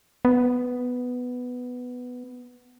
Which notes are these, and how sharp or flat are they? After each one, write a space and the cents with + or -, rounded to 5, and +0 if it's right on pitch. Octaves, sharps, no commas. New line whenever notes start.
B3 +5